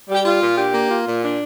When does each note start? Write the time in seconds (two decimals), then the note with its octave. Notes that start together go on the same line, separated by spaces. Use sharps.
0.08 G3
0.14 G4
0.25 F4
0.40 A#2
0.57 D4 G4
0.74 A#3
0.90 F4
1.06 A#2
1.23 D4